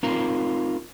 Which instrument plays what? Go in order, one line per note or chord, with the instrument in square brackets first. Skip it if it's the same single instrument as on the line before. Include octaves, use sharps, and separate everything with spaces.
[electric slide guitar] C4 D#4 F4 A#4 A#5